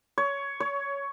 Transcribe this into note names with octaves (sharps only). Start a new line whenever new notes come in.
C#5
C#5